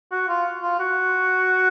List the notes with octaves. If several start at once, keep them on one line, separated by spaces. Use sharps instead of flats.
F#4
F4
F4
F#4